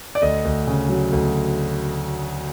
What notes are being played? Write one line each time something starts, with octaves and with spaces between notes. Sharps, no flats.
D5
D2 D#5
D2
C#3
F#3
D2